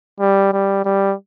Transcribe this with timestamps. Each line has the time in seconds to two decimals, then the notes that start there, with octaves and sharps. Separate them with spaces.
0.20 G3
0.53 G3
0.85 G3